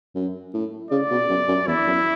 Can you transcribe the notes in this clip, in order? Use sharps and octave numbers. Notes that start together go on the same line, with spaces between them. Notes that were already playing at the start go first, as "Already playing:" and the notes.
F#2
A2
C#3 D5
B2
F#2
F#2
E2 E4
F#2